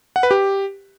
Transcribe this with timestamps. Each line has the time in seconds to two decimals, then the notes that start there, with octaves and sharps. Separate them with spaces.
0.16 F#5
0.23 B4
0.31 G4